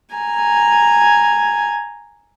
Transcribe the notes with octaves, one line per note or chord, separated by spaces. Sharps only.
G#5 A#5